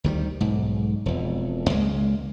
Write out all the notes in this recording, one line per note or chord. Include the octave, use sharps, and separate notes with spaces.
D2 D#3 G3
B1 G#2
E1 F2
C#2 G#3 A#3